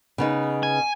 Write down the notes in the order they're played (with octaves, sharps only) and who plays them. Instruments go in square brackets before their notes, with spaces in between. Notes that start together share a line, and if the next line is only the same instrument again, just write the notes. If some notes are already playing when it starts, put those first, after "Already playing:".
[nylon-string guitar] C#3 B3 D#4
[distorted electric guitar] G#5